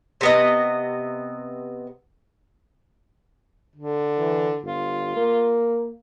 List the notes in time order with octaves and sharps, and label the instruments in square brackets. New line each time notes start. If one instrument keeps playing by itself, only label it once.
[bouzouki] C3 B3 D#5
[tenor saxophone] D3
[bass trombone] E3
[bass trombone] G1 [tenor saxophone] F4
[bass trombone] A#3